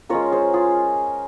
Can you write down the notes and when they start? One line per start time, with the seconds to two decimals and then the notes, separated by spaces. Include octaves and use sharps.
0.09 G#3 C#4 F4 A#4 C#5
0.32 G#4 C5
0.54 F4 G#4